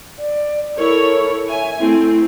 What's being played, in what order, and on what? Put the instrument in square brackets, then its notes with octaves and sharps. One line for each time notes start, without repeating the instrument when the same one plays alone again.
[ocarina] D5
[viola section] E4 A4 C#5 [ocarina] A#4
[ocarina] E5 [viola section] G#5
[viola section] A3 C4 [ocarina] E4